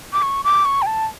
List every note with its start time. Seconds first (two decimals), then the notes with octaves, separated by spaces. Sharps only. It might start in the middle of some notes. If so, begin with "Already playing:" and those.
0.13 D6
0.22 C#6
0.44 D6
0.65 C#6
0.82 G5
0.86 A5